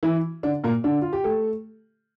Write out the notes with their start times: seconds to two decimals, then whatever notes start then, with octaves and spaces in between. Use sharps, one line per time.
0.03 E3 E4
0.43 D3 D4
0.64 A#2 A#3
0.84 D3 D4
1.02 F4
1.13 G4
1.24 A3 A4